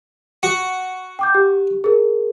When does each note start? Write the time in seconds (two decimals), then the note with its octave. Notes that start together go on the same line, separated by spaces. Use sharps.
0.43 F#4 C#7
1.19 G5 D6 G6
1.35 G4
1.84 G#4 A#4